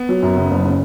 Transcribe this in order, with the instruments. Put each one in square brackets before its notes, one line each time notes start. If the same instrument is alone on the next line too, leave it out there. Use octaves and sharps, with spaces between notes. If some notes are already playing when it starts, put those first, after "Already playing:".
Already playing: [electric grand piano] B3
[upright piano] F#3
F#2
C#3
F#1
C#3